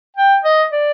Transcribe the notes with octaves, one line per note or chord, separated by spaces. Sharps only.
G5
D#5
D5